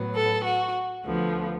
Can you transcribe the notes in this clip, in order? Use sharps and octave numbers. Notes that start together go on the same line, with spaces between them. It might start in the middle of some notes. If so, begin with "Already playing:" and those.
Already playing: A2 F#3 B3
A4
F#4
D2 D3 F3 B3